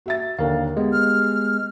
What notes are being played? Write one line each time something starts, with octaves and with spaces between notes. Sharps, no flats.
F#4 E5 A6
D#2 D3 A#4 F5
G#3 B3 G4
F6